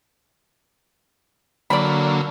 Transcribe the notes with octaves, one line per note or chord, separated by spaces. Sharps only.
D3 F#3 A#3 D5 B5